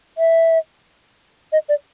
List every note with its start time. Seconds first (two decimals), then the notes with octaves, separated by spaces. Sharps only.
0.18 E5
1.52 D#5
1.69 D5